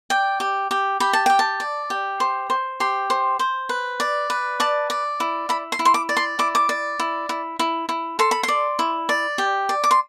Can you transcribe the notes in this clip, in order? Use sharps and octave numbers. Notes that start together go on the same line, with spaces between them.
D5 G5
G4
G4
G4 B5
A5
G4 G5
A5
D5
G4
C5
C5
G4 C6
C5
C5
B4
D5
B4
D5 A5
D5
E4
E4 B5
C6
E4
C6
D6
D5
C6
E4 D6
D6
D5
E4
E4
E4
E4
A4 C6
B5
C6
D5
E4
D5
G4
D5
D6
C6